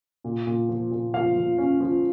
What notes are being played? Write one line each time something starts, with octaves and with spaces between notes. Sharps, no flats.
A#2
A#2
F3
A#2
F3 F5
F3
C#4
F3